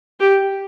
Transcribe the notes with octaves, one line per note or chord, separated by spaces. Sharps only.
G4